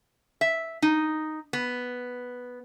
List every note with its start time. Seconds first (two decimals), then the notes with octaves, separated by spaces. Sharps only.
0.41 E5
0.82 D#4
1.53 B3